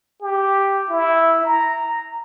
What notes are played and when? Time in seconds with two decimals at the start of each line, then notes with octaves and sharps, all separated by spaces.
0.22 G4
0.90 E4
1.45 A#5